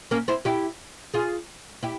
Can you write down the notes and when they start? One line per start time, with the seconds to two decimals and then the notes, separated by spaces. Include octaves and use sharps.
0.11 A#3 C#4
0.28 C4 E4
0.45 E4 G4
1.14 F4 G#4
1.83 E4 G4